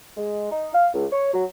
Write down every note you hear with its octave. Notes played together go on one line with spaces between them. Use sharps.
G#3
D#4
F5
C#2
C#5
F#3